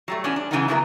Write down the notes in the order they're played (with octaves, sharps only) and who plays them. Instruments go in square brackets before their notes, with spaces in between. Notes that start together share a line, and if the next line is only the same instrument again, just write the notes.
[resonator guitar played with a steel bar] F#3 G3 A3
E3 B3 C#4 D4
D4
C#3 E3 F#3 B3 C#4 D#4
F#3 A#3 B3 E4 G#4 A#4